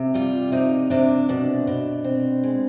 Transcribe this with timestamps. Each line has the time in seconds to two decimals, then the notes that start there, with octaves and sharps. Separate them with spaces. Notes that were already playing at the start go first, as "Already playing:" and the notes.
Already playing: C3
0.14 G3 F4
0.52 C3 D#4
0.90 C3 D4
1.29 B2 D4
1.67 B2
2.04 C4
2.44 G#3